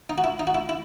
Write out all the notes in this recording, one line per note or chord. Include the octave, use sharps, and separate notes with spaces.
D#4
F#4
E4
D#4
F#4
E4
E4